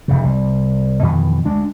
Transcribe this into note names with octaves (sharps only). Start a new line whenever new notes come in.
F1 A#1 C#3
C2
F2 B2 D#3 E3
D2 G#3 D4